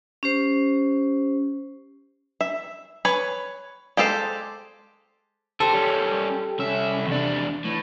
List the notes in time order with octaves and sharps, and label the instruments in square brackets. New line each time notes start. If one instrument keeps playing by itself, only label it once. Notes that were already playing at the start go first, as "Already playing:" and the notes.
[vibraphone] C#4 G4 C5
[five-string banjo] E5
B4 C#5 G#5
G#3 G4 A4 C5
[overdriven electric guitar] D3 C5 [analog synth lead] G4 [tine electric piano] A4
[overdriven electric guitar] G3 C#4
[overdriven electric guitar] C2 E5 [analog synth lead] C#4
[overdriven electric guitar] E2 D4 [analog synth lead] C3
[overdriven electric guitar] A2 [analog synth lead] E3